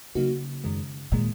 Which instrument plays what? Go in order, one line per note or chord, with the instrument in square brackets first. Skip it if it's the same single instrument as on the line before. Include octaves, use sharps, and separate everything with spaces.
[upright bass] C#3 [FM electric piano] F#3 A#3 D#4 F#4
[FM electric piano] F#2 D#3 G#3
[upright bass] A#2 [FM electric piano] D#3 G#3